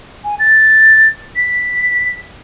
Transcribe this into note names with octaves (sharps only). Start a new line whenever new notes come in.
G#5
A6
B6